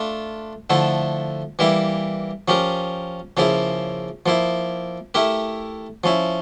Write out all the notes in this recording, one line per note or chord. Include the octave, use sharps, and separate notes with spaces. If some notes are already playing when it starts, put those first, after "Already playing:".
Already playing: A3 D4 F4
D3 F3 A3 E4
E3 G3 A#3 E4
F3 C#4 G4 A#4
C#3 F3 A#3 E4
F3 A#3 E4
A3 E4 G4 A#4
F3 C#4 E4